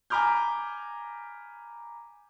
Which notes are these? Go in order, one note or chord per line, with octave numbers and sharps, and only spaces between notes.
G#5 A#5 B5 D6 F6 G6